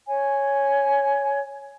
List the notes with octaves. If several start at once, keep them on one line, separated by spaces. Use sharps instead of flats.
C#5 G#5